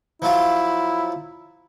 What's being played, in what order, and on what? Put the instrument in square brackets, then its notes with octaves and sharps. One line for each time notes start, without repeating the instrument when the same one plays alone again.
[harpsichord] F3 F#3 F4 [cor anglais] E4